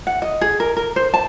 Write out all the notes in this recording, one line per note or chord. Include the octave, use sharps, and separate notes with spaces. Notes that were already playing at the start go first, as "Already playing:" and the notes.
F#5
D#5
G#4
A#4
A#4
C5
A5